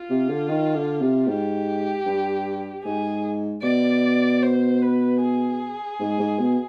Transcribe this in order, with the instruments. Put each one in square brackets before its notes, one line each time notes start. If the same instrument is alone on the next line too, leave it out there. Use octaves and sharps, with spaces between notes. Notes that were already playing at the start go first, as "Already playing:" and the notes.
Already playing: [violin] F4
[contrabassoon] C3
D3
D#3
D3
C3
[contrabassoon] G#2 [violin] G4
[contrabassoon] G2
[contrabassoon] G#2 [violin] G#4
[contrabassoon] B2 [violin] D5
[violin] C5
B4
G#4
[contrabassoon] G#2
G#2
B2